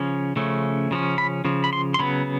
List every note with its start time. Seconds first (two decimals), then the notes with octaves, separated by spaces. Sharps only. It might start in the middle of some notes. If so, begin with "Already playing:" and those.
Already playing: C#3 F3 C#4
0.36 C#3 F3 A3 C#4
0.91 C#3 F3 C#4
1.18 B5
1.45 C#3 F3
1.64 B5
1.73 C6
1.94 C6
1.99 C#3 F#3 B3 B5